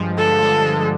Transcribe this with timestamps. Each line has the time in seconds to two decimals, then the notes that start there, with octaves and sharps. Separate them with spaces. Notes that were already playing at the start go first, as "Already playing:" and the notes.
Already playing: G2 F3 G#3
0.18 D3 A4
0.42 G#3
0.66 D3